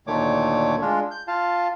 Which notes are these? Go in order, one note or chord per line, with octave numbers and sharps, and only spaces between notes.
D2 A#2 D#3 A3 C#5 D6
G#3 D4 F4
G6
F4 F5 A5